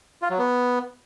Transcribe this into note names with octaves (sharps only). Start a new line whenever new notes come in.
F4
F#3
B3